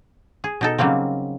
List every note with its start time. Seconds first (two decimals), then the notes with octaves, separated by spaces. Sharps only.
0.44 G#4
0.61 B2 D#4 A4
0.78 C#3 F#3 G3 A#3 C4